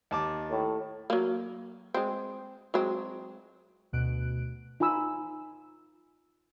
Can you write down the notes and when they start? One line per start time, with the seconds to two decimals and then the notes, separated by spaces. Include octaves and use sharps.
0.11 D#2 A5 D6
0.50 A2
1.10 F#3 A#3
1.94 G#3 C4
2.74 F#3 G#3 C4
3.93 D2 B2 F#6 D7
4.80 D#4 F4 G#5 B5 E6